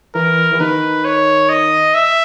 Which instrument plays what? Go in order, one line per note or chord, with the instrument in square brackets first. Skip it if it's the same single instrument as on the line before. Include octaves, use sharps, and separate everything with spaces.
[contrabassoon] E3 [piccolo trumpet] A#4
[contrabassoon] E3
[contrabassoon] D#3 [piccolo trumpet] B4
[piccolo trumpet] C#5
D#5
E5